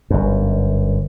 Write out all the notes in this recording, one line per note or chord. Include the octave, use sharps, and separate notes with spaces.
G1 F#2